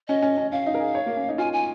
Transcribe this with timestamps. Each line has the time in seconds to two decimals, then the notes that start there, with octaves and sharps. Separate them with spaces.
0.08 C#4 D#5
0.22 C#4
0.37 C#4
0.52 C#4 F5
0.66 D#4
0.74 A#4
0.80 G#4
0.95 C#5
1.06 A#3
1.17 C#4
1.29 D#4
1.38 F4 G#5
1.53 G#5